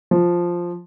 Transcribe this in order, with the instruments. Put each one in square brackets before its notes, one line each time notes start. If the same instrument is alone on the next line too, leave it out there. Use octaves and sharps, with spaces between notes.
[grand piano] F3